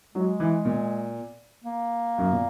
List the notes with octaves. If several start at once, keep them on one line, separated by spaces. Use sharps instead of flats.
F#3 G#3
E3
A#2
A#3
F#2
A#2